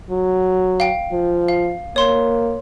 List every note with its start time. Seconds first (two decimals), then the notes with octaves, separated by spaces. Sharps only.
0.10 F#3
0.80 F5 G5
1.12 F3
1.48 F5
1.96 A#3 C#5 C6